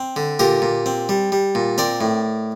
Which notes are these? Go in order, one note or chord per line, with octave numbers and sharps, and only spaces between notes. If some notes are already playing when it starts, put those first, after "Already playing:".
Already playing: C4
D3
A#2 G4 A#4
A#2
C4
G3
G3
A#2
C4 A#4 D5
A2